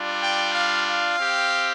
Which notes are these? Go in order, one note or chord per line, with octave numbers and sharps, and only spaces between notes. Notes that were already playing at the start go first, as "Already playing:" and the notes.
Already playing: G3 D4 F4
G5
F5
F5
C4 G4